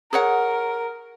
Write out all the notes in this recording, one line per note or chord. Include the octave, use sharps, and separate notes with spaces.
G#4 A#4 C#5 F#5